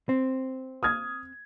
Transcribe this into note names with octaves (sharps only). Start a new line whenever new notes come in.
C4
D#6 F6 G#6